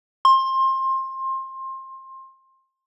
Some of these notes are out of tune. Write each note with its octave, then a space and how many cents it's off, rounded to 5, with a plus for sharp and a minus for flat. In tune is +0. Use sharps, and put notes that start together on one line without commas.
C6 +25